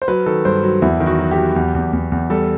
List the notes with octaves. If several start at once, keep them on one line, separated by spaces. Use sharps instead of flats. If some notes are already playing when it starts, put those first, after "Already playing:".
C5
F#3 B4
D#3 A4
G2 C5
F#3
E2 E4
D#3
F#4
F#3
G4
F#3
E2
E2
E2
E2
G3 A4